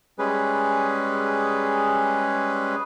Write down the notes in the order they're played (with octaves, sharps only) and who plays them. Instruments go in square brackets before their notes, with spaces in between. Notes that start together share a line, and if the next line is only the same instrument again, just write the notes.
[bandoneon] G3 G#3 C#4 G#4 B4